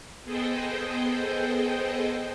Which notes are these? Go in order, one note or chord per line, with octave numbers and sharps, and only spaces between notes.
B3 G#4 A4 C5 D#5 G5